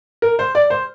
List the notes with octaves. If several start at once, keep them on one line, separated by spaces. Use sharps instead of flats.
A#4
C5
D5
C5